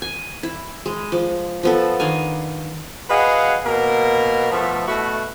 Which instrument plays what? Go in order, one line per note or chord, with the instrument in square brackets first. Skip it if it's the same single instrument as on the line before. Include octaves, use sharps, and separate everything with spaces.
[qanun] G#5
E4
G#3
F3
F3 B3 A4
D#3 D4 F5 G#5
[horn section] F#4 G#4 B4 D#5 F5 F#5
B2 A#3 A#4
B2 F3 A3
B2 A3 E4 F#4